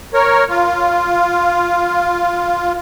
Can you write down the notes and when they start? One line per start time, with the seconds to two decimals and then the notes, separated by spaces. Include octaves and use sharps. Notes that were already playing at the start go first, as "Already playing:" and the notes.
0.14 A#4 C#5
0.50 F4